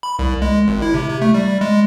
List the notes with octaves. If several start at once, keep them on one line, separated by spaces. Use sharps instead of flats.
B5
C2
G#3
G#1
E4
C3
C3
A3
G3
G#3